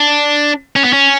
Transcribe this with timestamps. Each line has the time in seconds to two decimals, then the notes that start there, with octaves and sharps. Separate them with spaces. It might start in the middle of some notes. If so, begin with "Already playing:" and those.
Already playing: D4
0.76 C#4
0.84 B3
0.93 C#4